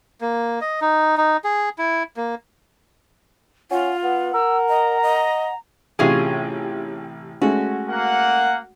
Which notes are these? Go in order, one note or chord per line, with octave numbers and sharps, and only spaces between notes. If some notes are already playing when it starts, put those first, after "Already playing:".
A#3
D#5
D#4
D#4
G#4
E4
A#3
C#4 F4 F#5
B3 F#5
A#4 E6
D#5 A#5
D#5
A1 C3 C#4 F4 G#4
G#3 A3 C#4 F#4
A#3 F#5